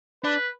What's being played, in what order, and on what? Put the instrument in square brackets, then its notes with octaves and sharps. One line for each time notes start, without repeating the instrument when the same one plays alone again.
[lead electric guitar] D4 [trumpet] B4